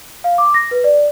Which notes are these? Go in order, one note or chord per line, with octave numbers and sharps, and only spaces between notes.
F5
D6
A#6
B4
D5